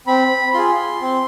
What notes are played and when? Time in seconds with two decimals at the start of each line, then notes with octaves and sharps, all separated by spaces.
0.07 C4 B5
0.54 F4 G#4 C6
1.02 C4